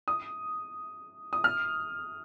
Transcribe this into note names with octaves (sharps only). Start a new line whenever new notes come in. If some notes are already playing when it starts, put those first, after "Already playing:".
D#6
D#6
F6